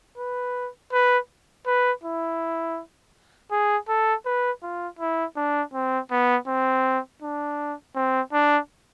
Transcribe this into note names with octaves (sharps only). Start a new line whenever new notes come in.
B4
B4
B4
E4
G#4
A4
B4
F4
E4
D4
C4
B3
C4
D4
C4
D4